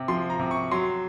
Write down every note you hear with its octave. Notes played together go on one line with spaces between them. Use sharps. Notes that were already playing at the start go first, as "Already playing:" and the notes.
Already playing: C3
F3 C6
A#5
C3
C#6
F#3 C6